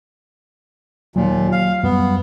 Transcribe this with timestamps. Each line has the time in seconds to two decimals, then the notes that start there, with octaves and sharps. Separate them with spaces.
1.16 D#2 A#2 F#3 A#3
1.52 F5
1.83 F#2 G3 B3